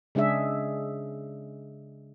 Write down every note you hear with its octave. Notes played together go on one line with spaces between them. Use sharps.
C#3 G#3 D4 G#4 E5